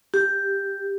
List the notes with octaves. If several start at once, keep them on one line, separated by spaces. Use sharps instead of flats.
G4